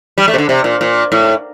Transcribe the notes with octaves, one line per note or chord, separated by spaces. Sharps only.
G3
A3
C3
D3
C3
A#2
A#2
A2